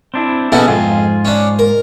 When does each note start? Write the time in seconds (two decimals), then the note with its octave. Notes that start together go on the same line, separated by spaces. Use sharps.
0.14 C4 D4 E4
0.52 B2 B3 C#4 E4 G#4 A4
0.68 F2 G#2 F4 G#4
1.25 C#4 D4
1.59 A#4